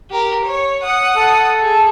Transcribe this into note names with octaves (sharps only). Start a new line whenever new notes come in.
G4 A#4
C#5
F#5 D#6
A4
G#4